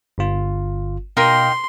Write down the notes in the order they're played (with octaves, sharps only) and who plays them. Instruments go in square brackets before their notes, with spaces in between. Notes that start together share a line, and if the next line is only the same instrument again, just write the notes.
[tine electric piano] G1 F4
[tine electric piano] B2 F5 [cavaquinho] D#4 A#4 G5 [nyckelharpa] C6